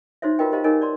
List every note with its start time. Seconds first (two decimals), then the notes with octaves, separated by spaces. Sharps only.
0.22 D#4 F#4 C5 C#5 E5
0.39 F4 F#4 A#4 B4 D#5 G5
0.52 G4 C5 D#5 F5 A5
0.64 D#4 G#4 A#4 C#5 D#5 G#5
0.81 D5 A5 C6